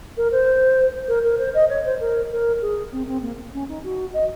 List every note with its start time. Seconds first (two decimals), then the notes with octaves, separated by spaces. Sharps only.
0.17 A#4
0.32 C5
1.08 A#4
1.24 A#4
1.39 C5
1.54 D#5
1.69 C#5
1.84 C5
2.00 A#4
2.31 A#4
2.62 G#4
2.92 C4
3.07 C4
3.22 A#3
3.53 C#4
3.68 D#4
3.84 F#4
4.13 D#5